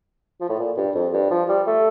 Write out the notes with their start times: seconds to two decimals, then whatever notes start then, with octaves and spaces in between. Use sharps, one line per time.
0.41 F3
0.49 A2
0.59 A#2
0.77 G2
0.95 F2
1.14 G2
1.31 F3
1.49 G3
1.67 A3